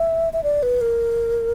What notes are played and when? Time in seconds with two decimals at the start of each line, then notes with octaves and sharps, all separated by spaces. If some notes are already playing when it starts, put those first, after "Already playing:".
Already playing: E5
0.33 E5
0.43 D5
0.63 B4
0.81 A#4